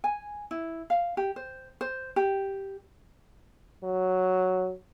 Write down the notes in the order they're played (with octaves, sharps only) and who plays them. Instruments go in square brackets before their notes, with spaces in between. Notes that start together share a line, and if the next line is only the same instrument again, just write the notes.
[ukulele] G#5
E4
F5
G4
C5
C5
G4
[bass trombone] F#3